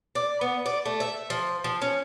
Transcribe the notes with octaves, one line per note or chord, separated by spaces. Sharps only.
D5
B3
D5
A3
E5
F3
F3
C#4